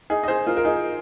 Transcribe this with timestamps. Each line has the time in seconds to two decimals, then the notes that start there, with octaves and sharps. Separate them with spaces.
0.10 D#4 G#4
0.23 D#5
0.28 G#4 C5
0.47 F4 A#4
0.57 A#4
0.65 D#4 G#4